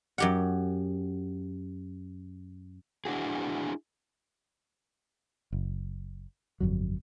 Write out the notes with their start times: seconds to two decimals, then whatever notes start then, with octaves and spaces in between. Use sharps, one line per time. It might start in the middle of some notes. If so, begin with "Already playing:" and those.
0.18 F#2 G4 F#5
3.05 D4 E4 F#4 G#4
5.52 F#1
6.60 G1 F2 F#3